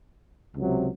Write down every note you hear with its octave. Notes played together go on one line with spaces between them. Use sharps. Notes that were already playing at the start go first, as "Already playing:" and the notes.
C#2 C3 F#3